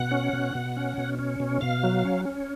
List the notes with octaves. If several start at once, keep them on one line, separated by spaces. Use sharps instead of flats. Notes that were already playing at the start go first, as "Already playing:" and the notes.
Already playing: B2 F#5
C#4
B2
B2
C#4
B2
C#4
B2
B2 F5
F#3
C#4
C#4